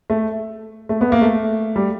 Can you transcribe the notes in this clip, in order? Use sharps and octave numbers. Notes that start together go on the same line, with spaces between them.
A3
A3
B3
A#3
A3
G3